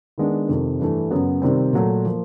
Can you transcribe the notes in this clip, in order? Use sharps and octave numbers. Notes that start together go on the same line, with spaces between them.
D#3 G#3 B3 D4
F2 C3 D#3
G2 E3 A3
F#2 C#3 F#3 B3
C3 D#3 G3 C4
A#2 F#3 A3
F3 A#3